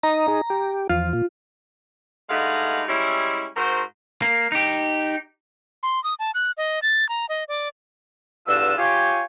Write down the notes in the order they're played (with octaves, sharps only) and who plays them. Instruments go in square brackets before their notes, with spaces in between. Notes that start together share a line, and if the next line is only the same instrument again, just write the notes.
[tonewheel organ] D#4 D#5 [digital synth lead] A#5
[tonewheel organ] D#4 G#4
G4
[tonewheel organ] E2 F3 [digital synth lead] F4
[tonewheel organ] A#2
[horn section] G2 G#3 A3 D#4 F5 F#5
G3 G#3 C#4 E4
G#2 F#4 A#4 C5
[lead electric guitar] A#3
D#4 G4
[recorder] C6
D#6
A5
F#6
D#5
A6
A#5
D#5
D5
[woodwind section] E2 G2 F4 A4 F#5 E6
F4 G4 C#5 G#5